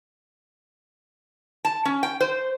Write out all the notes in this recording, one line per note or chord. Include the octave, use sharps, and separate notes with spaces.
A5
C#4
G5
C5